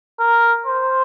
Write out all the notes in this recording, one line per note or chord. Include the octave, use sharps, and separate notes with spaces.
A#4
C5